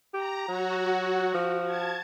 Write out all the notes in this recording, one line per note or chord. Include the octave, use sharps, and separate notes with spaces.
G4 A#5
F#3 F#4
F3
A5 G#6